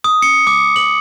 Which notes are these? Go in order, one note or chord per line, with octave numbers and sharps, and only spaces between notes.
D#6
C#7
D6
F#7